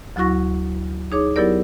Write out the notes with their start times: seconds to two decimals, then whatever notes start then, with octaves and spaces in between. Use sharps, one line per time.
0.16 D2 F#3 E4 F#4 C#6 A#6
1.12 D#4 G#4 C#5 D6
1.36 F#3 B3 E4 G4 A#4 D5